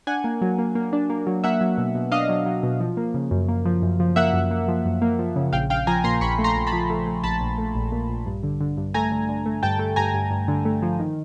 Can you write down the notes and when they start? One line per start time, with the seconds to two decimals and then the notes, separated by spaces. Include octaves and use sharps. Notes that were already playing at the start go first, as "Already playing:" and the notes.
0.07 D4 F#5 G#5
0.24 A#3
0.42 F#3
0.58 A#3
0.75 A#3
0.93 D4
1.10 A#3
1.27 F#3
1.44 A#3 E5 F#5
1.61 F#3
1.78 B2
1.95 B2
2.12 D4 D#5 F5
2.29 F#3
2.46 F#3
2.63 B2
2.80 F3
2.97 A#3
3.14 C#3
3.31 F#2
3.48 A#3
3.65 F3
3.82 F#2
4.00 F3
4.16 A#3 E5 F#5
4.34 F#2
4.51 A#3
4.68 F3
4.85 F#2
5.02 A#3
5.19 F3
5.36 C#3
5.53 A#1 F5 G5
5.70 A#1 F5 G5
5.87 F3 G#5 A#5
6.04 A#2 A#5 C6
6.21 A#1 B5 C#6
6.39 A3
6.44 A#5 C6
6.56 A#1
6.67 A5 B5
6.72 F3
6.90 A3
7.07 A3
7.24 A#1 A5 B5
7.41 A#1
7.58 A3
7.75 A#1
7.92 A#2
8.09 A#1
8.26 G2
8.43 D3
8.60 D3
8.77 G2
8.94 A3 G#5 A#5
9.12 D3
9.29 D3
9.46 A3
9.63 G2 G5 A5
9.79 A3
9.96 G2 G#5 A#5
10.14 G2
10.31 G2
10.48 D3
10.65 A3
10.82 F3
11.00 D#3